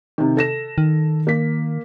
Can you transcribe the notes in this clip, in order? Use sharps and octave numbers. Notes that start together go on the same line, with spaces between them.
C3 D#3
A4 A#6 E7
D#3
A#3 B6